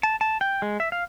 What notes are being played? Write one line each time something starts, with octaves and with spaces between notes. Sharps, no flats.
A5
A5
G5
G#3
E5
F5